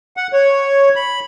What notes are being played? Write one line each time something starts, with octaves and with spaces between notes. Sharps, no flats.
F#5
C#5
B5